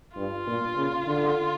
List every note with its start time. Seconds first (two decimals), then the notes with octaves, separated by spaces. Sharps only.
0.16 G2 F4
0.47 A#2
0.77 C#3
1.07 D3